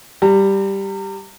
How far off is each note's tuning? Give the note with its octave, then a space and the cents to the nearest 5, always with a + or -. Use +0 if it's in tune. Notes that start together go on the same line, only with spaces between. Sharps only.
G3 +0 A#5 -35